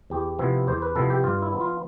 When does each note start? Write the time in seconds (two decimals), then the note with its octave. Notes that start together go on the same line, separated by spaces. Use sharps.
0.10 E2 G4
0.39 C3 F3 B3 E4
0.67 E2 C5
0.82 B4
0.95 C3 F3 B3 E4 A4
1.10 G4
1.24 G2 F4
1.42 E4
1.53 F3 B3 E4
1.61 F4